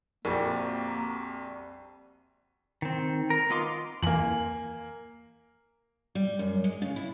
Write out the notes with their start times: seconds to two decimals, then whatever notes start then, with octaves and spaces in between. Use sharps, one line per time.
0.25 A#1 F2 G3 A#3 C4 F#4
2.82 D#3 C4
3.30 A#4
3.50 B3 F4 D#5 C6 D6
4.03 F2 E3 A#3 G#5 F#7
6.15 G3
6.39 F#2
6.64 G#3
6.82 C#3
6.96 E4